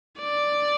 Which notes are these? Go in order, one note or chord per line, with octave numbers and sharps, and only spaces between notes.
D5